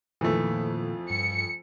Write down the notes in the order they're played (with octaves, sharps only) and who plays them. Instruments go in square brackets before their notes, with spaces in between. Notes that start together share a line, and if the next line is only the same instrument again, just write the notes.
[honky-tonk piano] F2 [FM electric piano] A#2 D#3 A#3 [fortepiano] E3 A3
[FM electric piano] G2 [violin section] C#7